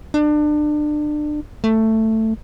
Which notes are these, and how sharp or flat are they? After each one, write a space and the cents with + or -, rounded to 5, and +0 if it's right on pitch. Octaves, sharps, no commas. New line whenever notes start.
D4 +30
A3 +10